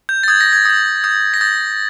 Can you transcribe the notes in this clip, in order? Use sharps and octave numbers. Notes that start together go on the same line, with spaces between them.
G6
A6
D#6 G6 G#6
A#6
G#6
D#6 G6
D#6 G6
A#6
D#6 G6 A6